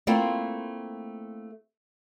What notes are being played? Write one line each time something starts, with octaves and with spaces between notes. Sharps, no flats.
A3 A#3 C4 E4 F4